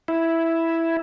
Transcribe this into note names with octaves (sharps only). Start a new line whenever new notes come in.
E4